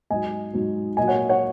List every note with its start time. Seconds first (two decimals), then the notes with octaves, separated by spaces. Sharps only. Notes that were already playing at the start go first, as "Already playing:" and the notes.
0.10 G#2 F#3 D#5 G#5
0.53 G#2 F#3
0.97 A#2 F#3 D#5 G#5
1.08 C#5 F#5
1.29 C#5 F#5